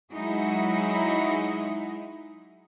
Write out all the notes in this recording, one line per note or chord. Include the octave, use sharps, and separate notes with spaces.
F#3 G#3 D#4 E4 F#4 G#4